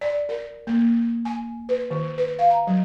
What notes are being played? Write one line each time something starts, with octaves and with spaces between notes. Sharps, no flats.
D5
A#4
A#3
G#5
B4
D#3
B4
F5
A#5
F#3